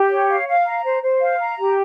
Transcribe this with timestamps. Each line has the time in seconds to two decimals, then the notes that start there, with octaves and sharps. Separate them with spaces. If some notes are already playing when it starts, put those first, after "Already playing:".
Already playing: G4
0.10 C#5
0.29 F5
0.48 F5
0.65 A#5
0.84 C5
1.02 C5
1.21 F5
1.39 A#5
1.57 G4